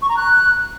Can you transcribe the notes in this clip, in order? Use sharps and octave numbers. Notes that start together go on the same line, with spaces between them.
C#6
A#5
F#6